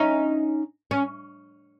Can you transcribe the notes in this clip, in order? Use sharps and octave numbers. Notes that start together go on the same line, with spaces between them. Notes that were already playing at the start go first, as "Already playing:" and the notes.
Already playing: C#4 D#4
C#4